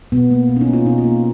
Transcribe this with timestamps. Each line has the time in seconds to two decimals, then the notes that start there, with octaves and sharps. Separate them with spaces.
0.12 B2 B3
0.31 A#3
0.49 B2
0.56 C#4
0.61 D#4
0.67 A#3
0.73 F4
0.85 B2 D#4
0.98 F4
1.04 A#3